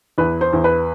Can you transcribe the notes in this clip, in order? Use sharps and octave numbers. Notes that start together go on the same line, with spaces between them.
E2 B4
C5
E2
B4